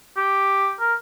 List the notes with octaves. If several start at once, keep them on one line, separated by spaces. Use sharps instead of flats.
G4
A#4